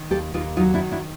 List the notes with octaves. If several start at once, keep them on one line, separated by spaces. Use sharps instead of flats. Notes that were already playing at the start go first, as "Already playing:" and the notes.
Already playing: D#3
D#2 G4 A4
D#2 D#4 F4
F#3 D#4 F4
D4 E4
D#3
D4 E4